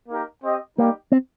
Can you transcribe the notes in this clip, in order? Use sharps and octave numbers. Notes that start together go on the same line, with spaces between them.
A#3 D#4 G4 A#4
C4 G4 D#5
G3 A#3 D#4 G4
C4